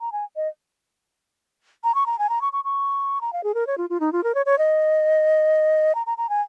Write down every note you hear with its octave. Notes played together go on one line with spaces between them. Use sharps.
A#5
G#5
D#5
A#5
C#6
A#5
G#5
A#5
C#6
C#6
C#6
A#5
F5
G#4
A#4
C#5
F4
F4
D#4
F4
A#4
C#5
C#5
D#5
A#5
A#5
A#5
G#5